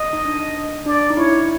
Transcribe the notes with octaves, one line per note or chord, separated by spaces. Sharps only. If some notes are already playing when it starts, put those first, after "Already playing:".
Already playing: D#5
D#4
D4
D4 D5
D#4
E4 C#5